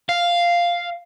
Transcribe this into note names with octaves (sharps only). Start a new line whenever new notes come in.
F5